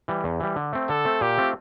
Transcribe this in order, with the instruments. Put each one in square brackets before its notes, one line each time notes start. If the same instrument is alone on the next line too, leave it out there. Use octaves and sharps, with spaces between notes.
[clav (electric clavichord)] E3 G3
E2
E3 G3
D3
A3 C4
[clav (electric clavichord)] D3 [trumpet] A4
[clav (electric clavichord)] A3 C4
[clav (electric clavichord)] A#2 [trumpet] G4
[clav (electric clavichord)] A3 C4 F4